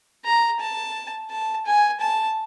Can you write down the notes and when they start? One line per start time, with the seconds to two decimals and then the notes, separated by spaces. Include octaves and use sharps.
0.25 A#5
0.60 A5
1.31 A5
1.66 G#5
2.01 A5